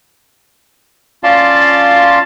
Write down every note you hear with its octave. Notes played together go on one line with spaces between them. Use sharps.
C#4 F4 D5 F5 A5 C6